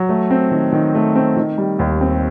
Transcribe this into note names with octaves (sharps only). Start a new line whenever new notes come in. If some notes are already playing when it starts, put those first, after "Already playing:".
Already playing: F#3
A3
C4
D#3
D#3
A3
C4
D#3
G3
D#2
C4